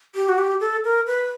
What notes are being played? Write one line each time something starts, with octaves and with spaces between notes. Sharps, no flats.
G4
F#4
G4
A4
A#4
B4